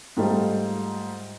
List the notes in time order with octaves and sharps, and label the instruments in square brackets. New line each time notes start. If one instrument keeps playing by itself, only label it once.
[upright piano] G#2 G3 A3 D#4 F4